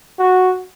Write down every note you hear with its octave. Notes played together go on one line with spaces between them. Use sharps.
F#4